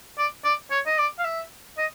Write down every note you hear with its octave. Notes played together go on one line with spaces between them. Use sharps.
D5
D5
C#5
D#5
D5
F5
E5
D#5